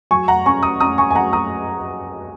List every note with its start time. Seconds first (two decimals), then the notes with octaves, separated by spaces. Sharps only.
0.11 F#3 G#5 C#6
0.28 F#5 A#5
0.46 C#4 G#5 C#6
0.63 A#5 D#6
0.80 C#4 A#5 D#6
0.98 G#5 C#6
1.11 G#5
1.15 F#3 F#5 A#5
1.33 A#5 D#6